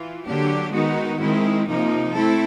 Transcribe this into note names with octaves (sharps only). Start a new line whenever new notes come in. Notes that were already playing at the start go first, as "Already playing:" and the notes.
Already playing: E3 F4
D3 F#3 A#3 D4 G4
D#3 G#3 B3 D#4 F#4
D#3 G#3 C4 E4
C3 F3 A#3 D#4
A3 C4 E4 A4